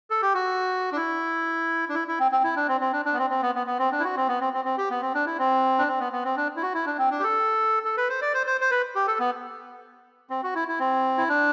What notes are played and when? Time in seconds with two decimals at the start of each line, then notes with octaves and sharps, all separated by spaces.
0.10 A4
0.22 G4
0.35 F#4
0.92 D4
0.96 E4
1.89 D4
1.94 E4
2.08 E4
2.20 C4
2.31 C4
2.44 E4
2.56 D4
2.68 C4
2.81 C4
2.93 D4
3.05 D4
3.13 B3
3.18 C4
3.30 C4
3.42 B3
3.55 B3
3.67 B3
3.79 C4
3.92 D4
4.00 E4
4.04 F#4
4.17 C4
4.28 B3
4.41 C4
4.53 C4
4.65 C4
4.78 G4
4.90 B3
5.02 C4
5.14 D4
5.26 E4
5.39 C4
5.79 D4
5.88 C4
6.00 B3
6.12 B3
6.24 C4
6.37 D4
6.56 E4
6.62 F#4
6.74 E4
6.86 D4
6.98 C4
7.11 D4
7.20 G4
7.24 A4
7.85 A4
7.97 B4
8.09 C5
8.21 D5
8.34 C5
8.47 C5
8.61 C5
8.71 B4
8.95 G4
9.07 A4
9.20 B3
10.30 C4
10.43 F#4
10.55 E4
10.68 E4
10.80 C4
11.18 E4
11.29 D4